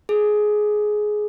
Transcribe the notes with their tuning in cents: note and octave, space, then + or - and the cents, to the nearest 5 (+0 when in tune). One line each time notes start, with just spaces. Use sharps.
G#4 +15